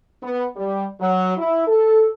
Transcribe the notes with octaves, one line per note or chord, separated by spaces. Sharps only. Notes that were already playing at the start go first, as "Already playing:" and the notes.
B3
G3
F#3
E4
A4